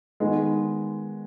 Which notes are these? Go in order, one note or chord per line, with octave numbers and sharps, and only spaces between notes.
D#3 G#3 B3